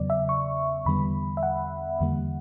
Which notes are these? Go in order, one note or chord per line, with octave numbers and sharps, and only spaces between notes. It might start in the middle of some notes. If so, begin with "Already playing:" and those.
Already playing: E2 C#3 F#3 B3 D5
E5
C#6
E2 D3 G3 B3 B5
E5
F#5
E2 D3 G3 A#3